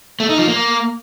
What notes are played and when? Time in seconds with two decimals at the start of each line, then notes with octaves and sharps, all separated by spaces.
0.20 A3
0.29 D#4
0.38 F3
0.48 A#3